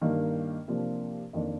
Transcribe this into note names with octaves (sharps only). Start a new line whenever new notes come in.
G2 D#3 A#3
C3 F3 A#3 D4
F2 D#3 A#3 D4